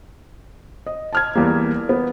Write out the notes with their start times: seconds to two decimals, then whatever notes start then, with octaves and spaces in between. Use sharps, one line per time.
0.86 D#5
1.13 A5 F6 G#6
1.35 E2 G3 A#3
1.89 B3